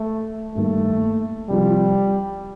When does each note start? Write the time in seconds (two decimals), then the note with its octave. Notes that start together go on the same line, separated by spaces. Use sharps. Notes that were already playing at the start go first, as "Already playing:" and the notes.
Already playing: A3
0.54 G2 D#3 A3 A#3
1.49 C3 F3 G3 C4 F4